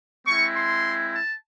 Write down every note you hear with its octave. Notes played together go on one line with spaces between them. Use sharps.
G#3 C4 E4 C#6
C6
A5